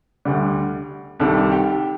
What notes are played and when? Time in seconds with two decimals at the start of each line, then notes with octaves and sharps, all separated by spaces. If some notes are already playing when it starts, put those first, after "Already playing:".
0.25 D2 D3 G3
1.20 C2 C3 D#3 G3 A4
1.52 G4